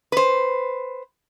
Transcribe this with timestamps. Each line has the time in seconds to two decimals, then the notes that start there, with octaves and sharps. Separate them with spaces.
0.12 B4 C5